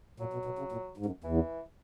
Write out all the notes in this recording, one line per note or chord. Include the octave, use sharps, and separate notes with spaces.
A#2 F#3
B2
B2
C#3
A#2
G#2
F#2
E2 E3